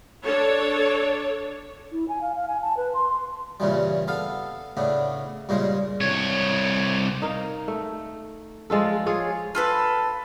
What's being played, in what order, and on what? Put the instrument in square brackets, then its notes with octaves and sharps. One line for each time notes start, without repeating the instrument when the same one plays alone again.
[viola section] D4 A4 C#5
[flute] E4
G#5
F5
F5
G#5
A5
B4
C6
C6
[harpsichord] G2 A#2 C#3 E3 G3
B3 A4 F5
A2 C#3 B3 D4
G2 A#2 C#3 G#3 C5
[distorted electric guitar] C2 C#5
[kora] D#4 A#4 F5
A3
F3 G#3 F4 A4
F4 G#4 C#5
[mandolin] F4 A4 B4